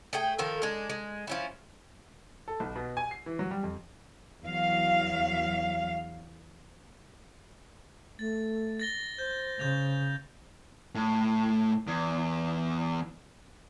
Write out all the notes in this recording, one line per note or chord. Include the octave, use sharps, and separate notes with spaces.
A3 G#4 G5
D#3 F3 A4 A#4
G#3 D4
G#3
F3 C#4 E4
A4
B1
B2
G#5
C7
E3
F#3
G3
F2
E2 F#3 F5
A3 A6
A6 A#6 G7
C5 G6
C#3 G6 A6 F7
A2
E2